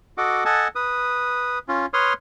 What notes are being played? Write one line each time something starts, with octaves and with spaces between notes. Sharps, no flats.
F#4 A4 D#5 F#5 D6
A4 D#5 F#5 G#5 A5
B4 D#6
C#4 F4
B4 C#5 C6 D#6 F6